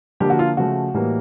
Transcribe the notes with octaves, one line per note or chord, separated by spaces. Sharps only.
D3 F3 A#3 G4
F#4
F4
C#3 F3 A3 F#4
A2 E3 G3 A#3